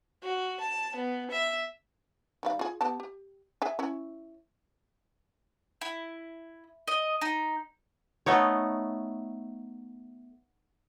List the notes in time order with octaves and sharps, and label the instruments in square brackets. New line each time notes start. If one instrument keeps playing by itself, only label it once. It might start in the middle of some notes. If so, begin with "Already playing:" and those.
[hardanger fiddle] F#4
A5
B3
E5
[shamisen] D#3 G3 F5
F4 G#4
B3 G4 A5
G4
G#4 E5 G#5
C#4 E4
[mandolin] E4
D#5
D#4
[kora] A3 B3 D#4 C#5